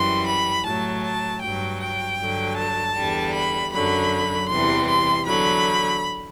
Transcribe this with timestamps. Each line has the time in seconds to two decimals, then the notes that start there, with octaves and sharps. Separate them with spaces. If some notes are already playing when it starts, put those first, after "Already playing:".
Already playing: F#2 E3 G3 C6
0.27 B5
0.64 A2 F#3 A5
1.03 A5
1.41 G2 F#3 G5
1.80 G5
2.19 G2 D3 F#3
2.57 A5
2.96 E2 D3 G3
3.33 B5
3.72 F#2 D3 F#3 B5
4.49 E2 C3 E3 G3 C6
4.87 C6
5.25 E2 D3 F#3 B5